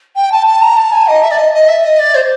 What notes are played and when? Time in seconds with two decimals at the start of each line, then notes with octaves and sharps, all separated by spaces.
0.16 G5
0.32 A5
0.46 A5
0.61 A#5
0.77 A5
0.92 G#5
1.07 D#5
1.23 E5
1.31 D5
1.38 D#5
1.54 D#5
1.68 E5
1.84 D#5
1.99 D5
2.15 C5